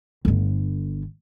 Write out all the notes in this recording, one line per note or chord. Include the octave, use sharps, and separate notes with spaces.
G1 D3